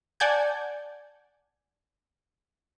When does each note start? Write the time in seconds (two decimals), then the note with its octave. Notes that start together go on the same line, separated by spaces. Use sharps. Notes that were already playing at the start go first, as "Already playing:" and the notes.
0.20 D5 F#5 G#5 A5 G6 G#6